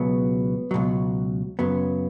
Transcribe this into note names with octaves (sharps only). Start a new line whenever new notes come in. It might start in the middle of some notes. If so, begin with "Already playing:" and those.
Already playing: C#2 B2 F#3 B3
C#2 B2 F#3
F#2 C#3 F#3 B3